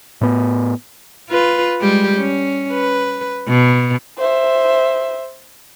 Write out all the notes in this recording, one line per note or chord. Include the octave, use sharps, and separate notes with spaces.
A2 B3
F4 B4
G3 G#3 G4
C#4
B4
B2
C5 E5